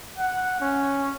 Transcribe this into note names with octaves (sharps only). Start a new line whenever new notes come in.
F#5
C#4